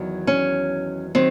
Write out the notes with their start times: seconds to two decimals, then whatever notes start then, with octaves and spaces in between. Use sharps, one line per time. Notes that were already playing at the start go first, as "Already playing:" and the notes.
Already playing: E2 D#3 F#3
0.27 C#4
1.15 D#3 F#3 C4